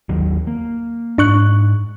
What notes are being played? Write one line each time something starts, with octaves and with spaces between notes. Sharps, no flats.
D#2 D#3 F#3
A#3
G#2 D4 C#6 F#6